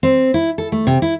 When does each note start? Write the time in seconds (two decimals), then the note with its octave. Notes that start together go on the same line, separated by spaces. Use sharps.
0.03 C4
0.34 E4
0.58 A4
0.72 A3
0.87 C3
1.02 E4